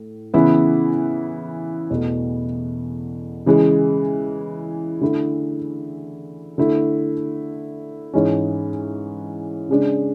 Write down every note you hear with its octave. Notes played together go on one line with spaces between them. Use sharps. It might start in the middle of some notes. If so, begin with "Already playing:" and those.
Already playing: A2
C#3 E3 B3 E4
E2 B2 A3
C#3 E3 G#3
D3 A3 E4
D3 A3 E4
G#2 E3 G#3 C#4
C#3 G#3 D4